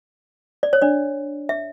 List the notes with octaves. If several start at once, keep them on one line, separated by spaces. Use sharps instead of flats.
D5
C#5
D4 D5
E5